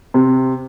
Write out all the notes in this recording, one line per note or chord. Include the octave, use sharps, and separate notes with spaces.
C3